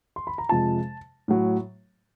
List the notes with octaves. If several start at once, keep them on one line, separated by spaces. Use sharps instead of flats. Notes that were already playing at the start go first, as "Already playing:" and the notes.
C6
B5
A#5
F2 C3 F3 G#3 A5
A2 F#3